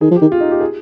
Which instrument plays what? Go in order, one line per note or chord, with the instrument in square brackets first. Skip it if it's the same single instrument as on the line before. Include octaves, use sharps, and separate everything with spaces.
[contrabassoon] D#3 [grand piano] G#4
[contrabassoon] F3
[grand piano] G4
[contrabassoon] D#3
[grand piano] F4
D#4
G4
G#4